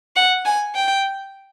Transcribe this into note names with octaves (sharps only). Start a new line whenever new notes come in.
F#5
G#5
G5